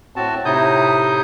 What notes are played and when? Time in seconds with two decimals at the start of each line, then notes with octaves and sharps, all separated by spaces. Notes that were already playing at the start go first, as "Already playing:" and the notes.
0.16 A2 C4 F#4 A5
0.45 A2 C3 D#4 E4 D#6 G6